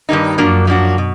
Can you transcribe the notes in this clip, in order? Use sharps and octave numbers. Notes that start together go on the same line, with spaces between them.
G2 D#3 G3 A#3 D#4
F#2 F3 A#3 D4 F#4
F3 A#3 D4 F#4
B2